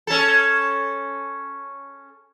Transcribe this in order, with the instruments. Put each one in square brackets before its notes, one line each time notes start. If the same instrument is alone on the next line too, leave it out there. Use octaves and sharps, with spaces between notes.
[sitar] C#4 A4